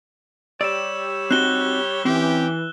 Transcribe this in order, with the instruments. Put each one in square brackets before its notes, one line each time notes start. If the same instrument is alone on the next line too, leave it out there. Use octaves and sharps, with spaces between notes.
[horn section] G3 G4 C#5 [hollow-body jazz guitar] D5 [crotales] E6 E7
[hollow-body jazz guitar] C4 D#4 F#4 [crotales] F#6 G7
[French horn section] E3 [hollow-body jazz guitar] C4 [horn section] C#4 G4